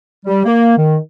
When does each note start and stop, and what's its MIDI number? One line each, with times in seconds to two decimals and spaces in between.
0.25 0.45 55
0.45 0.75 58
0.76 0.96 51